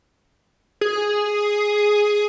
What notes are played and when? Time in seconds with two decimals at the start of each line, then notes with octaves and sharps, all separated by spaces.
0.81 G#4